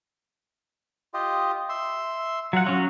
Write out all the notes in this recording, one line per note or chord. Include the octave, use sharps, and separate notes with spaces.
F4 G4 D#5
E5 C6
F#3 F4 F#5
F#3 C#4